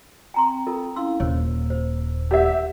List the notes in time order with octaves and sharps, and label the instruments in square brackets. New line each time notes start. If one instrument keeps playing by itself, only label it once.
[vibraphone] C4 G5 [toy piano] G#5 A#5 C6
[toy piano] F4 A4 A#4
[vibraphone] C#4 E4 F5 [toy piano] C6 E6
[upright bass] D#1 D#2 [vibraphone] A#3 E6 [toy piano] C5 C#5
[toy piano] C5
[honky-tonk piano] G4 E5 [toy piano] A#4 D5 F#5